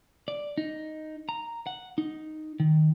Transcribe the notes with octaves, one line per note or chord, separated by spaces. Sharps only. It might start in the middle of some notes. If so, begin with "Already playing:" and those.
D5
D#4
A#5
F#5
D#4
D#3